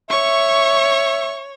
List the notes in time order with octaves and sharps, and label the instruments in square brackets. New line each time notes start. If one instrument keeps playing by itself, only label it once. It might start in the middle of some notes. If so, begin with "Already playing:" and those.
[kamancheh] C#5 [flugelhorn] E5 [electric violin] C#6